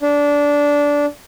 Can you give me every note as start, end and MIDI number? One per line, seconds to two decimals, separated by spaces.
0.02 1.06 62